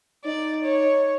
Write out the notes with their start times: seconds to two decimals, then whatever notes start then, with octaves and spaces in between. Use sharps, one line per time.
0.25 D#4 D5
0.63 C#5